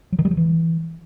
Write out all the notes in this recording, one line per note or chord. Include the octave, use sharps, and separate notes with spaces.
F#3
D#3
G3
F#3
E3